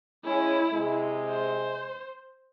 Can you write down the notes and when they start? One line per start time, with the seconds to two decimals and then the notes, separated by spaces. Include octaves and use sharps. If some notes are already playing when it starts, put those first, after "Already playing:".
0.25 G#3 C#4 E4
0.72 C3 G#3
1.29 C5